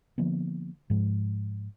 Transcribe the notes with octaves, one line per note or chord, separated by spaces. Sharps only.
D3 F3 A#3 B3
G#2 F3 G#3